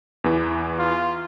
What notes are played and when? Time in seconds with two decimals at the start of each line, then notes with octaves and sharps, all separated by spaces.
0.24 E2 E3
0.78 F4